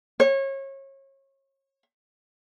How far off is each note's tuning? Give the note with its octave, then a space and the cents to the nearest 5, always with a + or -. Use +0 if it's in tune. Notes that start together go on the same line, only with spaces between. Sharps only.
C#5 -30